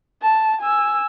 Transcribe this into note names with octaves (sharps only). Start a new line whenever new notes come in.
A5
G#5 E6